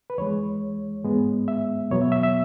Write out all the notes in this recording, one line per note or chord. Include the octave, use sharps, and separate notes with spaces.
B4
E2 E3 G#3 C#5
G#2 G#3 B3
E5
E2 B2 F#3 B3 C#5
E5
E5
E5